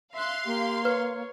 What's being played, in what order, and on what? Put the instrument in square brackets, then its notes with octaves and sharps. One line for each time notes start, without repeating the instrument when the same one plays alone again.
[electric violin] E5 F#6 [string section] F5 C6
[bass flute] A#3 [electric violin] G4
[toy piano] B4 [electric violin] C#5